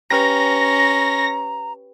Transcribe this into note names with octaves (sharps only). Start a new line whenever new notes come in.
C#4 G4 B4 A#5 F6 A#6